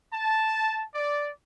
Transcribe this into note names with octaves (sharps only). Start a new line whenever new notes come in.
A5
D5